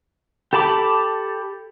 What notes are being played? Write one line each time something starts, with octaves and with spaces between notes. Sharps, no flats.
G4 A4 A5 B5 D6